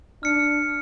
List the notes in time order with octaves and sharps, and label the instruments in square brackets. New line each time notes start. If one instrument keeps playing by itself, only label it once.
[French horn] D4 [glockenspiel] F6 C#7